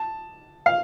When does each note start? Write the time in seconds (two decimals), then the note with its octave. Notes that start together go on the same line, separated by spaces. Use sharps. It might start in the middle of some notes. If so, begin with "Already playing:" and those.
Already playing: A5
0.66 F5